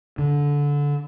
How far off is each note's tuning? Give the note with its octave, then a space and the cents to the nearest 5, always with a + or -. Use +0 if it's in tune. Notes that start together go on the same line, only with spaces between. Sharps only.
D3 -20